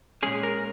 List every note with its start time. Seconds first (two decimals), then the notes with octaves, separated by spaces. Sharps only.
0.23 A#2 G#3 C#4 G#4
0.43 A#4